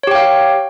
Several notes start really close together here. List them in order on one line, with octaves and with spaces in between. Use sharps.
C#5 G4 G5 F5